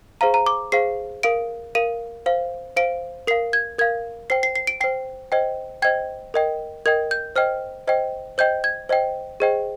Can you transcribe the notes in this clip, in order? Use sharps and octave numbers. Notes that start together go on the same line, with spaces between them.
G#4 C5 F5 A#5
A#5
D6
G#4 C5 F5 C7
A#4 F5 D7
A#4 F5 D#7
C5 F5
C5 F5 D7
A#4 F5 C7
G#6
A#4 F5 G#6
C5 G5 C7
C7
C7
D7
C5 G5 C7
C5 D#5 G5
C5 D#5 G5 G#6
A#4 D#5 G5
A#4 D#5 G5 G#6
G6
C5 D#5 G5 F6
C5 D#5 G5
C5 D#5 G5 G6
G#6
C5 D#5 G5
G#4 C5 D#5 G5